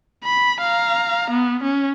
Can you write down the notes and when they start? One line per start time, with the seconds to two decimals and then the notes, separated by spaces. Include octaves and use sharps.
0.24 B5
0.60 F5 A#5
1.31 B3
1.63 C#4